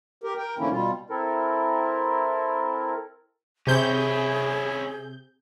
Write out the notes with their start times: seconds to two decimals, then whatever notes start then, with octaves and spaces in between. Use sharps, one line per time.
0.24 G4 A#4
0.37 A#4 G5
0.59 G#2 D3 E3 A#3 C#4 E4
0.70 B2 G3 F4
1.10 C4 E4 A4 A#4
3.67 C3 C#4 E4 G#4 G6